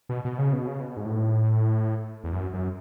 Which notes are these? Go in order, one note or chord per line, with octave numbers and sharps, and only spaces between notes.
B2
B2
C#3
B2
C#3
B2
G#2
A2
E2
F#2
F#2